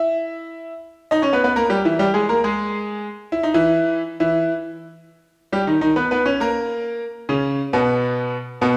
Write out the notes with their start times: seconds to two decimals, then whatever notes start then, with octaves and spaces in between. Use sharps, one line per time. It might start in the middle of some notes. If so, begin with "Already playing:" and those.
Already playing: E4 E5
1.11 D#4 D#5
1.22 C#4 C#5
1.33 B3 B4
1.44 B3 B4
1.56 A#3 A#4
1.70 G3 G4
1.85 E3 E4
1.99 G3 G4
2.14 G#3 G#4
2.29 A#3 A#4
2.44 G#3 G#4
3.32 E4
3.43 D#4
3.54 E3 E4
4.20 E3 E4
5.52 G3 G4
5.67 D#3 D#4
5.81 D#3 D#4
5.96 B3 B4
6.11 B3 B4
6.25 C#4 C#5
6.40 A#3 A#4
7.29 C#3 C#4
7.73 B2 B3
8.62 B2 B3